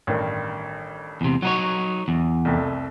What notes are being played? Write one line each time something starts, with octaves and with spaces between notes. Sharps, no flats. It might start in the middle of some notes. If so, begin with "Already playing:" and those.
A1 G2 D#3
E2 C3
F#3 D#4 F#4 C#5
E2
C2 F2 A3